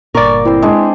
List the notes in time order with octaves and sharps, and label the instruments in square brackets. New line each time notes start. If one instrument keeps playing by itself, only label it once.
[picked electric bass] G1 A#2 [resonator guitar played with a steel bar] A#4 D5 [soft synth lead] C#6
[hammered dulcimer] C4 C5 [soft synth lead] E4
[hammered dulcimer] G#3 D4